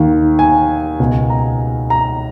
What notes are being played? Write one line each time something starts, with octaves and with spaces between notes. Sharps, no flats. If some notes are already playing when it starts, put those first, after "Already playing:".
Already playing: D#2 D#3
G#5
C#2 B2
A#5
A#5